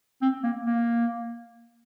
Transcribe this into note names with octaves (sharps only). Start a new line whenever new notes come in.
C4
A#3
A#3